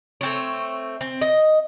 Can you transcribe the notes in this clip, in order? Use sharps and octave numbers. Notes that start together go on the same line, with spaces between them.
A3 C4 C#5
C4
D#5